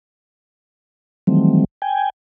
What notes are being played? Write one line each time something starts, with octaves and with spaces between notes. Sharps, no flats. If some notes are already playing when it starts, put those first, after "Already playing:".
D#3 E3 F#3 G3 A3 C4
G5 G#5